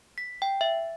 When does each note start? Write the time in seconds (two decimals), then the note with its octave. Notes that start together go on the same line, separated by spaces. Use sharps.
0.18 B6
0.42 G5
0.61 E5